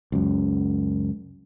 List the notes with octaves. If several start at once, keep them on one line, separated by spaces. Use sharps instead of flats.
C#2 F#2